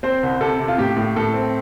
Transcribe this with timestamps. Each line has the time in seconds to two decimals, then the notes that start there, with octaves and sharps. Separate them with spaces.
0.03 C4 C5
0.23 C2
0.41 C3 A4
0.59 C3
0.68 F4
0.78 A2 G4
0.96 A2
1.16 A2 A4
1.34 C4